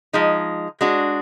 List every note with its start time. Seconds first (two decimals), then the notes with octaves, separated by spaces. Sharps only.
0.13 F3 G#3 D#4
0.81 G#3 D4 F#4